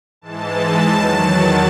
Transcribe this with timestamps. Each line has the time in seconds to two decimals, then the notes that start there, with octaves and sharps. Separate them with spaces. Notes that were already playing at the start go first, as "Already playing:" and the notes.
0.21 G#2 E3 G#3 A5
0.83 E2 D#3 F#3